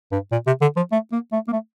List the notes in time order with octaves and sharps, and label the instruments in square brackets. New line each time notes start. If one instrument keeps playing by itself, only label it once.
[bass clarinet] G2
A#2
C3
D3
F3
A3
A#3
A3
A#3
A3